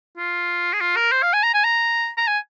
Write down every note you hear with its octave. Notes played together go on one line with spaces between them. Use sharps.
F4
G#4
F4
A#4
C5
F5
G#5
A#5
G#5
A#5
A#5
G#5